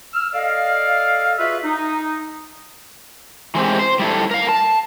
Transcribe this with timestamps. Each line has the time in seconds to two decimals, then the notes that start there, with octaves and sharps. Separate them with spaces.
0.14 E6 F6
0.34 A4 D5 D#5 F5
1.39 F4 F#4 G#4 B4 E5
1.64 D#4
3.55 E3 G#3 C4 G4
3.79 C5
3.99 G3 E4 A4
4.31 A#4 F5
4.49 A5